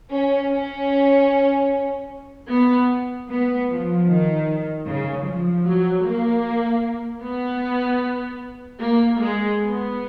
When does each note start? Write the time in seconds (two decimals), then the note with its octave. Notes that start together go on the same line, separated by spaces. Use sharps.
0.13 C#4
0.52 C#4
2.49 B3
3.28 B3
3.68 F3
4.07 D#3
4.86 C#3
5.25 F3
5.65 F#3
6.04 A#3
7.22 B3
8.81 A#3
9.20 G#3
9.59 B3